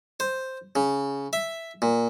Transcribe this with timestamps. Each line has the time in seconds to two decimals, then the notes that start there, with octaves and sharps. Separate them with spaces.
0.20 C5
0.76 C#3
1.33 E5
1.82 A#2